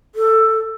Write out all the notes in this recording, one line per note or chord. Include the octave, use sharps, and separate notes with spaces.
A4